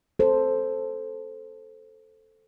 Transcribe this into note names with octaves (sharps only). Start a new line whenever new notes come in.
A4 C5